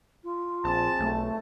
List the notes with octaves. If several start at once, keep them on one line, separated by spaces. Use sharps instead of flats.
F4
A#1 C4 G#4 A5
B1 A3